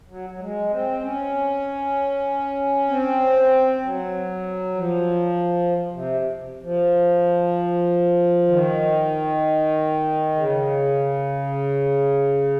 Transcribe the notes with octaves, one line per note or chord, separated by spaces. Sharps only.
F#3
F#3
G#3
C4
C#4
C4
F#3
F3
C3
F3
D#3
C#3